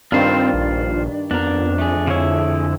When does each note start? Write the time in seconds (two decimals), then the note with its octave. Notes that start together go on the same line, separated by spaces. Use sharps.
0.12 G2 D#3 C4 D4 F4 C5 F5
0.54 A#1
1.31 F2 B3 D4 A#4
1.78 A3 G#4
2.07 D3 E4 C#5 F5